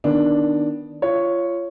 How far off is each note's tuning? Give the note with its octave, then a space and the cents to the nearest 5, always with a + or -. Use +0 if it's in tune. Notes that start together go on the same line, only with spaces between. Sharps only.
D#3 +0 B3 -10 D4 +0
F4 -25 C#5 +0